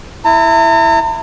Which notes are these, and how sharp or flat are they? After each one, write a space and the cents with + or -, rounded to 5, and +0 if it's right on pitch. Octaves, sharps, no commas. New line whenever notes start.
E4 +0 A#5 -45